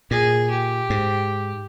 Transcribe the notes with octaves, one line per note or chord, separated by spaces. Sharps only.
A#2 G#4 G#5
G4
G#2